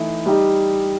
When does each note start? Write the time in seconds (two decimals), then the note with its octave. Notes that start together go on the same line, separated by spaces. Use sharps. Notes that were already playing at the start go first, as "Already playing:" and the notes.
Already playing: E3 A3 D#4
0.26 G3 D#4 G4